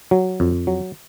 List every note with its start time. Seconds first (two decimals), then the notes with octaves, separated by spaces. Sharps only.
0.11 F#3
0.40 F2
0.67 F#3